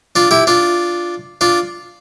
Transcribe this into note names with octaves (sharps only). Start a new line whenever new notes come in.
D4 F4
E4 G4
D4 F4
D4 F4